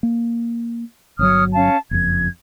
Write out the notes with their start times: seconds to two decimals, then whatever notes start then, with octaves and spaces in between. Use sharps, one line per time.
0.03 A#3
1.19 G1 C3 F#3 C#5 D#6 F6
1.53 C#4 F5 A5
1.91 F#1 F2 G#6